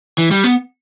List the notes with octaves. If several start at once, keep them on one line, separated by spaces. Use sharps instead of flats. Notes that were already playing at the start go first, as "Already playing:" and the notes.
E3
G3
B3